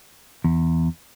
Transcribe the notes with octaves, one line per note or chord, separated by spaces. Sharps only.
E2